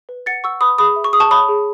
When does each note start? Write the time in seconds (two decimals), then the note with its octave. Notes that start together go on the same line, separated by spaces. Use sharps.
0.09 B4
0.26 F#5 A6 C#7
0.44 F#5 C#6 E6
0.61 B4 B5 D#6
0.78 G#4 B5 D#6
0.96 E5
1.04 C#6
1.13 G#4 D#6
1.20 A5 C#6
1.30 C#5 B5 D#6
1.49 G#4